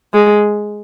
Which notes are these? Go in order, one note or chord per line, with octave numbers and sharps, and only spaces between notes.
G#3